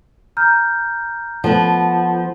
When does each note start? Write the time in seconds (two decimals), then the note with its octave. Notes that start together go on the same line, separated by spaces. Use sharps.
0.37 A#5 F6 G6
1.44 F3 B3 A4 F#5 A5